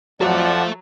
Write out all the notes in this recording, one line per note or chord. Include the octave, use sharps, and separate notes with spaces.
F2 F3 F#3 A4 D5 E5 F#5